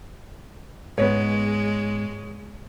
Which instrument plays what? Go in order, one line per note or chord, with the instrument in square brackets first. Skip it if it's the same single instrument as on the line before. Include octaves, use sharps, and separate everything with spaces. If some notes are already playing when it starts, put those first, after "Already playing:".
[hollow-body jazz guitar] G#2 B3 [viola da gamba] G#3 [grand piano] C#5